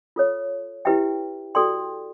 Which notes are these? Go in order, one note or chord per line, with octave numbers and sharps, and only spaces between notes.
F4 A4 C#5
E4 G4 B4 E5 G5
F#4 A4 D5 G5 C6